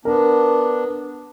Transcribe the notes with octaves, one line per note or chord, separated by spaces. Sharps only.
B3 D4 A#4